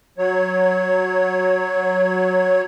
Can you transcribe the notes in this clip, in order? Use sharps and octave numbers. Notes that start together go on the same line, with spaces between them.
F#3 C#5